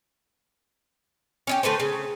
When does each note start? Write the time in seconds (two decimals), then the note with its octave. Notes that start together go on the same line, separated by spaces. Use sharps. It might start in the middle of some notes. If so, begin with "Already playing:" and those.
1.47 C#4 D#4 G4
1.63 D3 A3 B4 C5
1.80 C#3